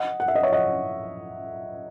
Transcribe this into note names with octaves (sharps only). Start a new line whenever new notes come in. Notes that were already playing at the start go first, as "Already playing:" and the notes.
Already playing: D#5 F#5
F#5
E5
D#5
C#5 E5
D#5 F#5